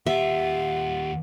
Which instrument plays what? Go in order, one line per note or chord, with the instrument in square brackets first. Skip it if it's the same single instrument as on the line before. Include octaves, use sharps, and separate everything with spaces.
[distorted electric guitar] D#2 F4 [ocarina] G4 [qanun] E5 [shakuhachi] F#5